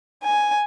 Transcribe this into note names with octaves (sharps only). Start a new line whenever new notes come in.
G#5